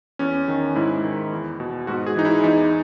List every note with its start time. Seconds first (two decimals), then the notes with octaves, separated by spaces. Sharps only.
0.19 E2 C#4
0.48 D#3
0.76 G#2 E4
1.04 D#3
1.32 E2
1.60 B2
1.87 G#2 F#4
2.06 G#4
2.16 E3 D#4
2.25 E4
2.43 E2 D#4